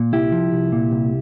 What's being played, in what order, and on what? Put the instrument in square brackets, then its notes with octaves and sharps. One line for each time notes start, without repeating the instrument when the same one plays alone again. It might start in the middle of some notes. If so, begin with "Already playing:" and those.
Already playing: [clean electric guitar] A#2
C2 E4 G4
F3
C2
A#2
C2